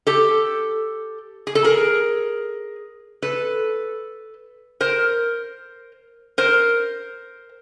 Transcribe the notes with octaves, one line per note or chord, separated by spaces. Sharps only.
G4 A4
G#4
A4
G#4 A#4
A4 B4
A#4 C5
A#4 C5